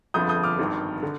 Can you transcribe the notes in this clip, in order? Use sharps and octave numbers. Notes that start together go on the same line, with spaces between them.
G1 F2 D3 F3 D#6 G6
D#6 G6
D6 F6
G#1 G2 D#3
D3